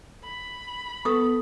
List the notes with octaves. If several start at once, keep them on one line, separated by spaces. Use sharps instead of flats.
B5
B3 A4 C#6 D#6